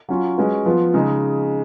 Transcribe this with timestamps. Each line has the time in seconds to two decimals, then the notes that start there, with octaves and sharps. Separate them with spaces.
0.09 F#3 C#4 F4
0.38 G#3 C#4 F#4 B4
0.66 F3 B3 F4
0.94 C#3 G#3 D#4